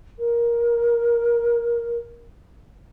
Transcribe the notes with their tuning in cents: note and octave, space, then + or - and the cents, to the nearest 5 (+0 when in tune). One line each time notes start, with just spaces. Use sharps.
A#4 +15